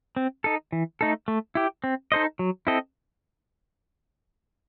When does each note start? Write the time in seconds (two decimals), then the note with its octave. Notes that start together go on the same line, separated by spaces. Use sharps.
0.16 C4
0.44 D#4 A4
0.72 E3
1.01 A3 D#4 A4
1.28 A3
1.55 E4 G4
1.84 C4
2.12 D#4 A4 C5 D#5
2.39 F#3
2.67 C4 E4 A4 D#5